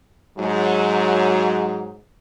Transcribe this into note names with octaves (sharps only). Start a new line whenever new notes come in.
G#2 F#3